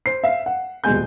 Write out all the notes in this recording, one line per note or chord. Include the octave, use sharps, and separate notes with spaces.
C5 C7
E5 F5
F#5
D#1 B2 G#3 G#5 G6